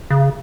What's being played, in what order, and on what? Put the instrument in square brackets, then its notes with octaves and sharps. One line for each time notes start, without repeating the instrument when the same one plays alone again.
[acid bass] C#3